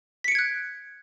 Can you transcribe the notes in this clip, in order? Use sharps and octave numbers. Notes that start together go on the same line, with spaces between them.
F#6 G#6 B6 C#7 D7